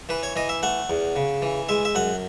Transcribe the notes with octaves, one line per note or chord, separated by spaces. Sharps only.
E3 B4
C#5
E3 D#5
E5
A3 F#5
E2
C#3
E3
G#3 E5
E5
F#2 F#5